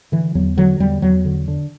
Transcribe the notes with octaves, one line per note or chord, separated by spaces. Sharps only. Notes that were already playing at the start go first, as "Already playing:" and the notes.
D3 E3
E2 F#3
D3 F#3
E2 G3
E2 F#3
D3
D3